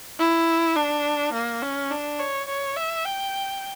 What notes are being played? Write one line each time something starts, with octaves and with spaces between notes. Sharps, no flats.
E4
D4
A#3
C#4
D4
C#5
C#5
E5
G5